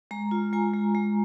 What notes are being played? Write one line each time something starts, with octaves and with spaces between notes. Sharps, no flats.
G#3 A#5
F4
G#3 G#5
G#3
G#3